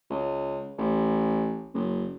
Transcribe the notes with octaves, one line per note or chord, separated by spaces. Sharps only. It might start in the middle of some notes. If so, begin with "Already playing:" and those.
C#2
A1
F#1